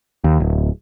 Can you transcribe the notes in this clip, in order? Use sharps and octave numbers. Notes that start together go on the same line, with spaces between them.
D#2
D1